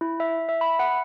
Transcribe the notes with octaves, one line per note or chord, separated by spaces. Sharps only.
E4
E5
E5
B5
F#5